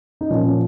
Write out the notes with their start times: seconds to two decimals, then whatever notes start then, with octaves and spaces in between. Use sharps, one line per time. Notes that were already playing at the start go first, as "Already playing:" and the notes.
0.21 D#4
0.30 A#2 F3 A#3 C#4
0.45 C#4